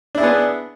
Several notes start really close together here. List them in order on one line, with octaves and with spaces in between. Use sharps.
D4 E4 G#4 B3